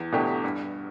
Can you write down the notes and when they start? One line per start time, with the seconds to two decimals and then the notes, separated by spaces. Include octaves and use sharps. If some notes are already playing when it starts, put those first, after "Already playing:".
Already playing: E2
0.12 B2 A3 D4 G4
0.44 G2